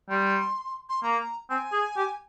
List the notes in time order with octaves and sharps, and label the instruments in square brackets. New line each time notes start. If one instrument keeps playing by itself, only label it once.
[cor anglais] G3 [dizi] C6
[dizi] C6
[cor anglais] A#3 [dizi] A#5
[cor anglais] C4 [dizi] G#5
[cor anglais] G#4
G4